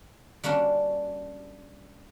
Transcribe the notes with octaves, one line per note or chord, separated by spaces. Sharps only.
G3 A#3 C#4 D4 F#4